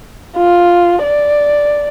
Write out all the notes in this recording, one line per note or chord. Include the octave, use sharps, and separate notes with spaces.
F4
D5